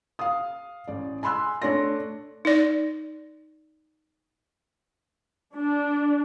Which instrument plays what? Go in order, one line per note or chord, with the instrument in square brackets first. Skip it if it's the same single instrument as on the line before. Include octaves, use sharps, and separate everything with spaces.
[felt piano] F5 D#6
A1 D5
G#5 B5 C6 E6 F#6
A3 D4 C#5 C6 A#6
[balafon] D#4 D5
[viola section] D4